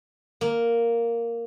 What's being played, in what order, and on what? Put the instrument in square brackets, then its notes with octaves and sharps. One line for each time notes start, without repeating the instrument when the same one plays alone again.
[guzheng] A#3